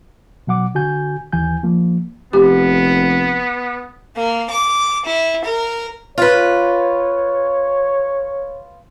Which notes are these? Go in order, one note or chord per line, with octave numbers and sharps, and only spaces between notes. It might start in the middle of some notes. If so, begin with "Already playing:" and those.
B2 F#3 F#5 D6
D3 F#4 G#5 G6
D#2 E3 G#5 G6
F3 A#3
F1 B3 G4
A#3
D6
E4
A#4
F4 B4 C#5